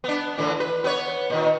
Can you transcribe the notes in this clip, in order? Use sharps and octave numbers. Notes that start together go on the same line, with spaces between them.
B3 D4
A2 D3 E3
B4
B3 B4 C#5
A#2 D#3